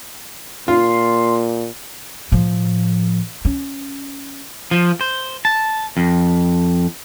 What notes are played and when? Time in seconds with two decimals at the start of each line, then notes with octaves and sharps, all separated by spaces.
0.68 A#2 F4 C6
2.32 A2 F3
3.45 C#4
4.71 F3
5.01 C5
5.45 A5
5.97 F2